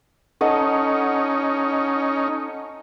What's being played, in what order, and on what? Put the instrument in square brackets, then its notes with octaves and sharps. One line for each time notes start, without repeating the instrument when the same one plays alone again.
[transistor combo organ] C#4 D#4 [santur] A4 D#5 F#5